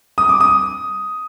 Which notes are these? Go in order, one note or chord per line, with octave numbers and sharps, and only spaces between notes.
D#6
D6
D#6